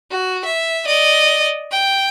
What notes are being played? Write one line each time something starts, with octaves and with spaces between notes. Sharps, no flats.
F#4
E5
D5 D#5
G5